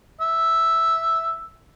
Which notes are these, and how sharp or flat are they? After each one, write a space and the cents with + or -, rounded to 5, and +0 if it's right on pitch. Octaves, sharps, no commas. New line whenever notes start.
E5 +0